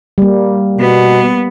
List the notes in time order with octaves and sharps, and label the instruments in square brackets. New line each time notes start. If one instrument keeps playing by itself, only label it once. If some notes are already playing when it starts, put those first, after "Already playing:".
[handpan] G3 A#3
[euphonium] B2 [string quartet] B3